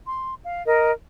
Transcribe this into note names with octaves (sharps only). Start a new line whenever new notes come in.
C6
F5
A#4 D#5